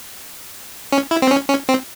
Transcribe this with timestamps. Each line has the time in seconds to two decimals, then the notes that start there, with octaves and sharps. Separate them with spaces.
0.92 C#4
1.11 E4
1.22 C4
1.31 C#4
1.49 C#4
1.69 C4